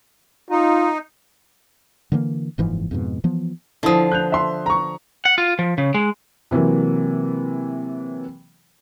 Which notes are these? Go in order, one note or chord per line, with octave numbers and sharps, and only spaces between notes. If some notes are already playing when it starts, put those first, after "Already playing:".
D#4 F4
D3 E3 G#3 A#3
F#1 G#2 E3 F3
F2 G#2 B2
E3 F3 B3
D3 F3 E4 D#6
F#6 G6 F7
E5 C6
A#5 C#6
F#5
F4
F3
C#3
G#3
C3 E3 F#3 A#3